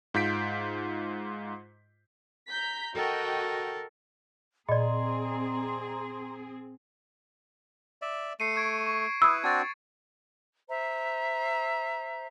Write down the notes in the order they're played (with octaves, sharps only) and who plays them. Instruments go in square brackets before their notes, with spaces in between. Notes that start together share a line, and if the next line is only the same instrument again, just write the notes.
[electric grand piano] G#2 F4 G6 B6 D7
[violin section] A#5 G6 B6
[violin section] F#4 D#5 G5 [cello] A4 A#4
[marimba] A#2 [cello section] C4 G#4 [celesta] D5 D#5 [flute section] A#5 C6
[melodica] D5 E5
[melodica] A3 [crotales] C7 C#7 D#7
[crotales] C#6 G#6 D7
C#6
[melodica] E4 B4 [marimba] D#6 E6
[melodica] C4 D4 F#4 [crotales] G#6 A6
[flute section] C5 E5 A#5